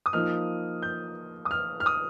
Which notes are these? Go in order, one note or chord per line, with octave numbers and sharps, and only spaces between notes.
D#6
F3 A#3 D#4 F6
G6
D#6
F6
F6
D#6